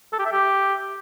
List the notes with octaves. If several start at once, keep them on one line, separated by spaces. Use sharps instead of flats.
A4
G4
E5
G4